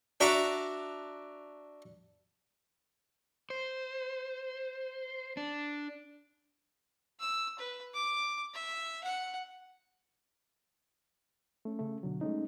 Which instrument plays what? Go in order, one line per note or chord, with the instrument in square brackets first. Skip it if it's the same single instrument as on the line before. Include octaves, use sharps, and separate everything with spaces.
[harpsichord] D4 F#4 E5 A5 A#5 D6
[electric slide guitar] C5
D4
[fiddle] E6
B4
D6
E5
F#5
[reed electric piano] A3 C#4
C#3 A3
B2 D3 F#3
G#3 A3 C#4 D#4